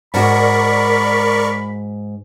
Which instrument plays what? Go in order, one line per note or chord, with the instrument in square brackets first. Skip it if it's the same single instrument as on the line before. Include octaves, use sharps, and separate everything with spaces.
[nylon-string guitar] G#2 F#4 [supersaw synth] A#4 D5 C#6 [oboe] B5